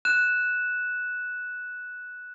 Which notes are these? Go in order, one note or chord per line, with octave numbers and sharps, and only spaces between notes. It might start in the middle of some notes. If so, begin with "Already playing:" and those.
F#6 E7